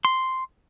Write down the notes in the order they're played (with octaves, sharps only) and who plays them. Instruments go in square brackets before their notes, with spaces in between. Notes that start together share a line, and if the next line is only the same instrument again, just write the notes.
[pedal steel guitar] C6